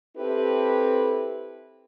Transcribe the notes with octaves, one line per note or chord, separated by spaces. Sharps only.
C4 E4 G4 A4 B4